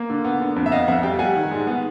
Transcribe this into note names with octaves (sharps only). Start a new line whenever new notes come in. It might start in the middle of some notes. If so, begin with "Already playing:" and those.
Already playing: A#3
D3
B3
D3
F2
E5
B3 D#5 F5
F2 E5 F#5
G3 F5 G5
G3 F#5 G#5
D#3
G#2
B3